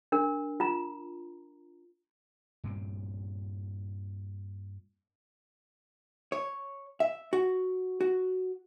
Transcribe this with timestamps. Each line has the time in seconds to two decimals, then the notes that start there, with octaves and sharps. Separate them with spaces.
0.12 D4 A#4
0.60 F4 A#5
2.64 G2 A#2 C4
6.32 C#5
7.00 E5
7.33 F#4
8.01 F#4